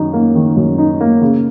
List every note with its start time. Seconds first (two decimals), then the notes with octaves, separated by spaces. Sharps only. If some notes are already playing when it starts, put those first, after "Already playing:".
Already playing: F#2 D#3 D#4
0.13 A#3
0.35 D#3
0.56 F#2
0.78 D#4
1.01 A#3
1.22 C#3